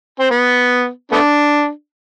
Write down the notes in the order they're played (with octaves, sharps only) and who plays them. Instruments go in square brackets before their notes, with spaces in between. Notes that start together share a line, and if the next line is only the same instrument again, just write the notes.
[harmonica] C4
B3
A3 B3 D4